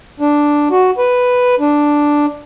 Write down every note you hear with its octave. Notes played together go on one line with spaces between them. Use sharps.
D4
F#4
B4
D4